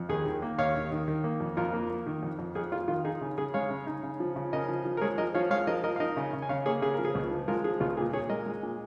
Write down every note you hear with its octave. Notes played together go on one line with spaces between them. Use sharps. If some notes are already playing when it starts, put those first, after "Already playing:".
Already playing: F2
D#2 G#4
D#3
A#3
D#2 C#5 F5
D#2
D#3
D#3
A#3
F2
F2 F4 A#4
A#3
A#3
D#3
F2
F2
F2 G#4
F2 F4
D#3 F4
D#4 G#4
C#3
C#3 G#4
G#3 C#5 F5
C#3
D#4
C#3
F3
C#3
C#3 A#4 D#5
F3
F3
A#4
G#3 G#4 C#5
F3 A#4 D#5
F3 C#5 F5
G#3 C#5 F5
F3 A#4 D#5
F3 A#4 D#5
F5
D#4 A#4 D#5
C#3
C#3
G#5
C#3 C#5 F5
A#3 G#4 C#5
C#3 G#4
F3 A#4
G#4
C#2
F3
G#3 F4 A#4
F3 G#4
C#2 F4
A#2 G#4
A#2 G#4 C#5
G#3 A#4 D#5
G#3
A#2